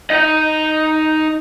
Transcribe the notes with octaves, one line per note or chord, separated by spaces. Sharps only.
D#4 D#5